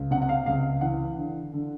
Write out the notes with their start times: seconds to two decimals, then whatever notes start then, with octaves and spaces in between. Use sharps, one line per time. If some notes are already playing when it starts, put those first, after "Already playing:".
Already playing: C#2
0.11 C3 F#5
0.22 F#5
0.29 F5
0.46 C#2 F5
0.81 E3 F#5
1.17 D3
1.53 D3